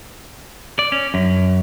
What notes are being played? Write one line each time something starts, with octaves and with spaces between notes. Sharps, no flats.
D5
C#4
F#2